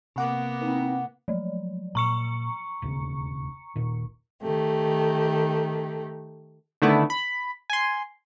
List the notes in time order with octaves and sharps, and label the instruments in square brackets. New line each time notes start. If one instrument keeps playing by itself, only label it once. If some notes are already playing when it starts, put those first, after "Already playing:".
[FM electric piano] C3 F#5 D6 [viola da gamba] A#3 B3
[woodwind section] E3 C4 D#4
[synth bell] F3 F#3
[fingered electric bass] A#2 [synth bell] A#5 C#6 C#7
[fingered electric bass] E1 D#2 C#3
D#1 A#2 D#3
[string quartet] D#3 A3 G4
[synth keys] D3 D#3 A3 B3 E4
B5
G#5 C6